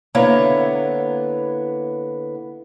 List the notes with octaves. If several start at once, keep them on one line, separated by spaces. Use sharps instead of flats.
D3 A#3 B3 E4 C#5 A#5